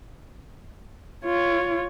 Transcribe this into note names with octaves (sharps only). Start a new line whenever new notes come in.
F4 C#5